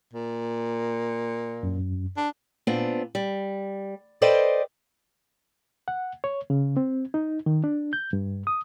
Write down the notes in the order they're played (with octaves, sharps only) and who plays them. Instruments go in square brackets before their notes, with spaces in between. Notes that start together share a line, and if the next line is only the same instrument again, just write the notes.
[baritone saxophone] A#2
[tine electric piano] F#2
[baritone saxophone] D4
[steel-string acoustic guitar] A#2 B3 C4 D4
G3
A4 B4 C5 D5 D#5 G5
[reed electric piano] F#5
C#5
C#3
C4
D#4
D#3
D4
G6
G2
D#6